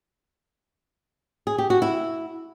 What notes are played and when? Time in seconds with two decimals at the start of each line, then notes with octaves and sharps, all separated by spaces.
1.47 G#4
1.58 G4
1.70 F#4
1.82 E4